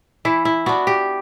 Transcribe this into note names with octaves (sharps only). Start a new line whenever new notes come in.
E3 E4
E4
B3 D4 F#4
G4